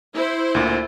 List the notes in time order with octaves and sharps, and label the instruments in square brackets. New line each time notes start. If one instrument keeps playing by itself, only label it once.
[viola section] E4 C5
[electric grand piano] D2 A#2